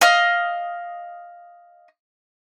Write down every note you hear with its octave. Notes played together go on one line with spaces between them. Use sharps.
D#5 F5 F6